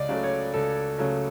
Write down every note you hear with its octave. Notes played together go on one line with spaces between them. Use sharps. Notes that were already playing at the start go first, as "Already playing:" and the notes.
Already playing: C#2 D5 D#5
C#3 F#3 A3
C#5
C#2 A4
C#3 F#3 A3